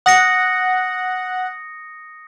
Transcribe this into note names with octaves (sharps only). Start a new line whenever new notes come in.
F#5 D#6 A#6 C#7